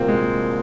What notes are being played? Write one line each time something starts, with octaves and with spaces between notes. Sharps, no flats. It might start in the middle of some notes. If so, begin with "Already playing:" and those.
Already playing: C2 A#2 F#3 A#3 C4
G#3